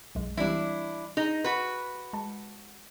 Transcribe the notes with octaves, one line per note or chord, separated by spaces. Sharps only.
B1 F#2 G#3
E3 G3 C4 D4 E4
D4 D#4 G#4
F#4 B4
G#3 A5